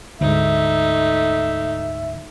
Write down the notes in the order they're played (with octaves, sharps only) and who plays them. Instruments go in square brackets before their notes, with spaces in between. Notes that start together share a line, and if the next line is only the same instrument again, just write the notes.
[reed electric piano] D2 G#2 [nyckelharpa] A3 D#4 [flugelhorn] E5